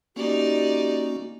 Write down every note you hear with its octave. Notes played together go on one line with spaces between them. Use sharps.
A#3 C#4 D#4 F#4 G4 D5